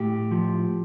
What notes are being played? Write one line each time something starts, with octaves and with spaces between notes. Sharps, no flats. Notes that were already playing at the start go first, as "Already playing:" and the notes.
Already playing: A2 G4
F3